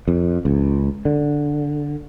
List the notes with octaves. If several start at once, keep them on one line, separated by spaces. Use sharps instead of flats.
F2
C#2
D3